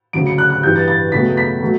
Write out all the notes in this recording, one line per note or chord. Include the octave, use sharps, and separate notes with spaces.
D2 C#3 F#3 D7
C#7
F#6
F#6
G2 E3 G3 G6
A6
A6
C#2 B2 F#3 A3 B6
B6
F#3 A3